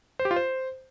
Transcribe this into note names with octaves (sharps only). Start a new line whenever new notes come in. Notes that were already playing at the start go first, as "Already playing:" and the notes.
C5
G4
F4
C5